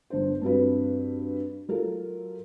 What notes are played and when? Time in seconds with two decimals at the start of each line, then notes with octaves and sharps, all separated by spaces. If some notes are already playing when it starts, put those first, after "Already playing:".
0.10 G1 D4 C5
0.42 G2 C4 F#4 B4
1.69 F#3 F4 A4 A#4